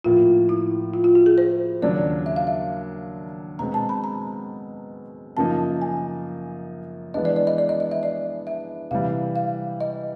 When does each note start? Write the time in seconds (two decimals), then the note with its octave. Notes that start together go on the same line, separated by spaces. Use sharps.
0.04 A2 F3 A#3 F4
0.49 E4
0.94 F4
1.04 F4
1.15 F#4
1.26 G#4
1.38 C5
1.82 D#2 C#3 F#3 A#3 D4 D5
2.26 E5
2.36 F5
2.47 E5
3.59 B2 G#3 C4 A#5
3.74 A5
3.89 B5
4.04 A#5
5.37 F#2 C#3 F3 A#3 D#4 A5
5.82 G#5
7.14 E3 G#3 B3 D4 D#5
7.25 D5
7.36 D5
7.47 D#5
7.58 D5
7.69 D#5
7.80 D#5
7.91 E5
8.03 D5
8.47 E5
8.91 C3 E3 G3 F5
9.36 F5
9.81 D#5